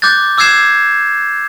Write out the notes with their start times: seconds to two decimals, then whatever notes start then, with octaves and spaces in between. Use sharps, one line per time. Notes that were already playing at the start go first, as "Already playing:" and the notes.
0.02 D6 F#6 G6 A6
0.38 D6 E6 F#6 G#6 C7 E7